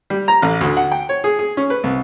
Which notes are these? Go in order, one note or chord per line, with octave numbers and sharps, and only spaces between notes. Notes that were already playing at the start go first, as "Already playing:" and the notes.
G3
A#5
A1
D2
F#5
G5
C#5
G#4
G#4
C#4
B4
C2